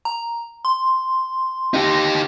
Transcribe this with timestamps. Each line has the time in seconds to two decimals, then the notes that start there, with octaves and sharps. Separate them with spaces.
0.05 A#5
0.65 C6
1.74 D#4 G4